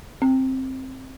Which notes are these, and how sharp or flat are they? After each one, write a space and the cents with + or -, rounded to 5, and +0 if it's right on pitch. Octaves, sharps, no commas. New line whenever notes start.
C4 +10